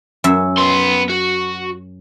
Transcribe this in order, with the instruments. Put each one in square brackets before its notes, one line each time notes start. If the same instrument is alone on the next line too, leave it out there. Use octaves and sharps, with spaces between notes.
[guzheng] F#2 E5
[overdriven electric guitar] B3 C6
F#4